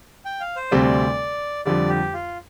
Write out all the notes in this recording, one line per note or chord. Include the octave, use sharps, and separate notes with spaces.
G5
F5
C5
D2 C3 G3 C4 D5
F2 D3 G3 D5
G4
F4